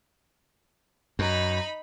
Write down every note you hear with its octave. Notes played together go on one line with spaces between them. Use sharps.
F#2 D#4 B5